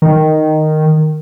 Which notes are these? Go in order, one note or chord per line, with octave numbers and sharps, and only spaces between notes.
D#3